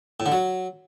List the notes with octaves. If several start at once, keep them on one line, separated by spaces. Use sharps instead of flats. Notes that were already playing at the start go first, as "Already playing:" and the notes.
A2
D3
F#3